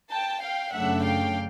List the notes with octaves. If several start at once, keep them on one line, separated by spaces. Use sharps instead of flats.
G5 A5
F5 G5
F#2 C#3 F#3 A3 D4 E5 F#5
F5 G5